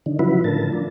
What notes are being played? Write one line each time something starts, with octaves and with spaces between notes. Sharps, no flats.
D3 D#3
C#3 F3 F#3 E4 B4
A2 D3 A#4 A5
F3 D4